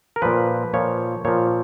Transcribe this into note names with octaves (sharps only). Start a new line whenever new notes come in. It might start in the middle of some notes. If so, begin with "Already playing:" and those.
A#4
A#2 F3 B4
A#2 F3 C#5
A#2 F3 C#5